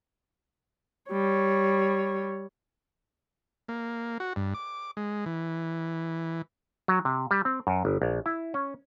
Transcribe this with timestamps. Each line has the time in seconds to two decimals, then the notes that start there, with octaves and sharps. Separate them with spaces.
1.12 G3 C#5
3.69 A#3
4.20 F#4
4.36 G2
4.54 D6
4.97 G#3
5.26 E3
6.88 F#3
7.05 C3
7.31 G3
7.45 C4
7.67 F#2
7.85 G1
8.02 A#1
8.26 E4
8.54 C#4